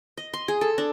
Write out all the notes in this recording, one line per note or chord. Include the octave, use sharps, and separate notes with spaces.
D#5
C6
G#4
A4
D4